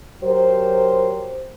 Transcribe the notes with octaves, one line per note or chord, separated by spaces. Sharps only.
F#3 G4 A#4 C5